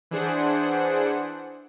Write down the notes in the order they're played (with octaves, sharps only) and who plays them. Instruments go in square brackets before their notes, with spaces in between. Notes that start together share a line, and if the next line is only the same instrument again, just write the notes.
[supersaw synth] E3 D4 G#4 C5 F#5